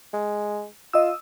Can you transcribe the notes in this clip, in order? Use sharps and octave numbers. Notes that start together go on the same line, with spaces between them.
G#3
F4 D#5 E6